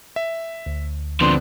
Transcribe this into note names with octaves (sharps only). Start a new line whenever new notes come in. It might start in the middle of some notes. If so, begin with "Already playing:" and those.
E5
D2
D3 F3 B3 C4 D4 C6